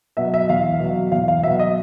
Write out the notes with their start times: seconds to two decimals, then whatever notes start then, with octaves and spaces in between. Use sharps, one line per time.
0.17 B2 F#3 E5
0.34 E5
0.49 E2 F5
0.80 B2 F#3
1.12 E2 F5
1.28 F5
1.43 B2 F#3 E5
1.59 D#5